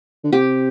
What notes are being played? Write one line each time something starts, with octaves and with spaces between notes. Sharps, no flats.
D3
C3 G4